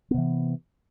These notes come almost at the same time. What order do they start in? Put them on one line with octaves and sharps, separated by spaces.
B3 C3 E3